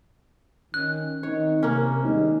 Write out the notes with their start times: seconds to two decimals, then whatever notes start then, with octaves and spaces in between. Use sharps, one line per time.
0.74 D#3 C#4 F#6
1.23 D#3 C4 D#4 C#5
1.63 C3 A#3 C#4
2.04 D#2 G3 G#3 D#4